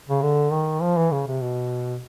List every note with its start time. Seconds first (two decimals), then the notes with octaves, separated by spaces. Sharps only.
0.09 C#3
0.22 D3
0.52 D#3
0.82 F3
0.97 E3
1.11 C#3
1.27 C3
1.41 B2